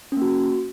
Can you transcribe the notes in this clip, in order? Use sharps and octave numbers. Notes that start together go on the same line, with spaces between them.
A#3 C#4 F#4